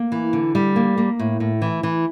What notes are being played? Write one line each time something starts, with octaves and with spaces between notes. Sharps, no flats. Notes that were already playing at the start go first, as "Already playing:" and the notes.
Already playing: A#3
E3
D3
G3
A#3
A#3
A2
A2
E3
E3